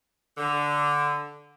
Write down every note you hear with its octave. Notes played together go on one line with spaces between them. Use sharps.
D3